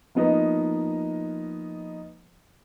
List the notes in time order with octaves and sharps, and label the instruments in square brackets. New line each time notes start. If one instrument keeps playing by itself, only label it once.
[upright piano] F3 A#3 B3 D#4 D#5